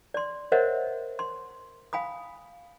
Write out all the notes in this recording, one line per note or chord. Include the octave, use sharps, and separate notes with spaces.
D5 C6
A#4 C5 C#5 D#5 E5 F#5
C6
F5 G#5 B5 D#6